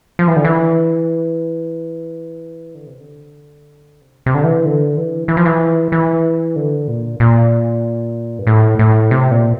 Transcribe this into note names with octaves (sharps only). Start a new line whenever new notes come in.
F3
E3
D3
E3
D3
C3
D3
C3
C3
D3
E3
D3
E3
E3
F3
E3
E3
D3
A#2
A#2
G2
A2
A2
C3
A#2